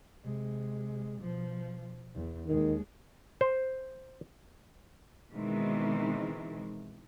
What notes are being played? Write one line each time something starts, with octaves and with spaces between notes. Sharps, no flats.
C3 G#3
B2 F3
E2
D#2 D#3 G#3
C5
B2 D#3 E3 G#3 C4